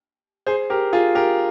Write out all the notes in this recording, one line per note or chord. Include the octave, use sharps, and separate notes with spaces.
G#4 C5
G4 A#4
F4 G#4
G4 A#4